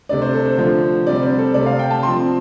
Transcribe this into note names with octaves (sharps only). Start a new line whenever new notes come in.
C3 A3 D4 D5
C5
A4
C5
D3 F3 A3
C3 G3 C4 D5
C5
A4
C3 A3 C4 D5
F5
G5
A5
F3 C4 C6